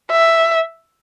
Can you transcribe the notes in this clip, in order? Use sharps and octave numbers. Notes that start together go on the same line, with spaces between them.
E5